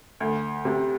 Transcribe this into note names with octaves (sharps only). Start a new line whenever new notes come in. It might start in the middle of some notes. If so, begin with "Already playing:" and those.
D2
C3